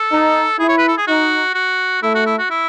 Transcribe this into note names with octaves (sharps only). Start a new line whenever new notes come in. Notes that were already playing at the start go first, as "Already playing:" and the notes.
Already playing: A4
D#4
E4 G#4
C#5
B4
A4
G#4
D#4 F#4
F#4
A3 E4
F#4
E4
F#4
E4